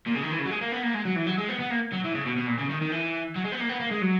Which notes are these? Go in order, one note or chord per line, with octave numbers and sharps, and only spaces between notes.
A#2
C#3
D#3
E3
C#3
F#3
G#3
A#3
B3
A#3
G#3
F#3
E3
F#3
G#3
B3
B3
A#3
F#3
E3
C#3
B2
B2
A#2
C#3
D#3
D#3
E3
F#3
G#3
B3
A#3
B3
A#3
G#3
F#3